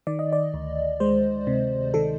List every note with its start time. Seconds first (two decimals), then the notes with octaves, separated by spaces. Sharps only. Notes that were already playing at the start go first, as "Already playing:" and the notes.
0.07 D#3 D5
0.19 D#5
0.33 D5
0.54 D2
1.00 G#3 C5
1.47 C3
1.94 D#3 A4